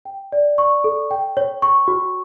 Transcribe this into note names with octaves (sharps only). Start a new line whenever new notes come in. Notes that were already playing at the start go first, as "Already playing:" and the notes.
G5
D5
C#6
A4
G5
C#5
C#6
F#4